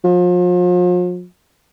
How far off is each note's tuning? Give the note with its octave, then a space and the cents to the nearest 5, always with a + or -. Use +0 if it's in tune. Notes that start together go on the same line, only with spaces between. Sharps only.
F3 +40